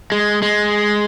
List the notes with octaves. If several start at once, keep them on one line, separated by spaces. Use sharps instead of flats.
G#3
G#3